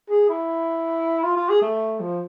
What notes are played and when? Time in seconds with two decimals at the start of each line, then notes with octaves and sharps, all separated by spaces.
0.10 G#4
0.29 E4
1.24 F4
1.36 F4
1.49 G#4
1.61 A3
2.00 F3